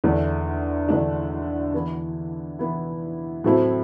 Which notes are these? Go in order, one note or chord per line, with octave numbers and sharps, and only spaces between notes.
E2 D3 A3 D4
E2 D3 A3 D4
E3 B3 E4
E3 B3 E4
A2 F#3 A3 C4 E4